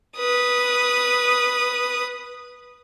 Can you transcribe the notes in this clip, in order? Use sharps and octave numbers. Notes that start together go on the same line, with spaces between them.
B4 D#6